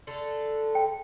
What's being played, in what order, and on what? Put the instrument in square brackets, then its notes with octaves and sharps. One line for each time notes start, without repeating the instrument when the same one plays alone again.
[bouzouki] D3 A3 A4
[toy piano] G5